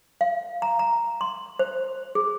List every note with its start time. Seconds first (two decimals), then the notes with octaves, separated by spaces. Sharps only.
0.21 F5
0.62 A#5
0.79 A#5
1.21 C6
1.59 C5
2.15 G#4